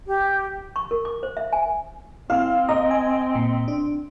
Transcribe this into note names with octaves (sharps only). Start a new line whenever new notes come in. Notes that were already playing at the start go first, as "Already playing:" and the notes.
G4
C#6
A#4
D6
C5
E5
G#5
C4 E4 F5
D#5 A#5
G#5
A#2
D4